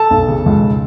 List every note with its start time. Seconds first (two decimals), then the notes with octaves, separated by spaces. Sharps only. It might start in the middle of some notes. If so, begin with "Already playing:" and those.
Already playing: A4 A5
0.11 B1
0.28 C#3
0.46 C#2